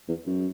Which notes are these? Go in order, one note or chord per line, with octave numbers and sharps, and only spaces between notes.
E2
F#2